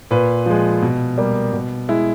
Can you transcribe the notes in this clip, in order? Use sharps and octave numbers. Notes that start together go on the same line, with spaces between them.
A#2 B4
F3 G#3
B2
G3 A#3
B2
G#3 E4